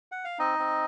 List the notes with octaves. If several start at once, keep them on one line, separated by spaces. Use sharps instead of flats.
F#5
F5
C4 D#4 D#5
C4